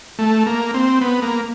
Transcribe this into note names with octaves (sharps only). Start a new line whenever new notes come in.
A3
A#3
C4
B3
A#3